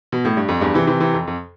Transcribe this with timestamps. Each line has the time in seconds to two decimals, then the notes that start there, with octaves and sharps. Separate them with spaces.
0.12 B2
0.25 A2
0.37 G2
0.48 F2
0.61 E2 G2
0.74 C3 E3
0.87 C3 E3
1.00 C3 E3
1.14 F2
1.27 F2